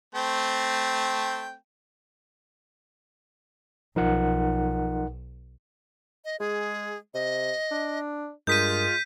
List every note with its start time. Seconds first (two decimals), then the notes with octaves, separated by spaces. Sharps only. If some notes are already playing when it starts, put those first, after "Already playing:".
0.15 A3 C4 G5
3.96 B1 F3 D#4 A#4 F#5
6.25 D#5
6.40 G#3 G#4
7.14 C3 D#5
7.71 D4
8.47 G2 G#3 F4 A#4 D#6 G6 B6 D#7